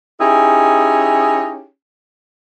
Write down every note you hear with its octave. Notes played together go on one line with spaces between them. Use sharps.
C#4 D#4 E4 G4 G#4